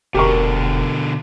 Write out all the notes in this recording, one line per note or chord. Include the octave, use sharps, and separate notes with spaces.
F1 B2 D3 G4 A#4 C#6